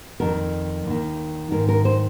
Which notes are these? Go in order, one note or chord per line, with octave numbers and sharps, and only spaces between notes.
F2 D#3 A#4
D#2 D#3
G#2 D#3 A#4
A#4
C5